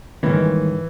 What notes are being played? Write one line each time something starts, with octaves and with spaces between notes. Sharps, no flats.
G#2 D#3 E3 G3 A#3 C#4